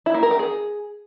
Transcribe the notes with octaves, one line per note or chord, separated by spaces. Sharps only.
E4
A#3
A#4
G4
G#4